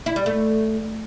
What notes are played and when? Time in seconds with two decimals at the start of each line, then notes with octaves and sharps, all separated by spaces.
0.06 E4
0.16 G3
0.26 A3